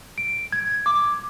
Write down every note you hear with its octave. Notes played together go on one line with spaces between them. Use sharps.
D7
G#6
D6